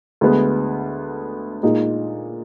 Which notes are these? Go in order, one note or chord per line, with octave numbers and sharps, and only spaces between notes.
D2 D3 G#3 B3
A#2 G#3 D#4